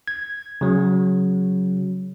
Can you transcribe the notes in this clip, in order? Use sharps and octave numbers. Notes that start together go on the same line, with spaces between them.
G#6
C#3 F#3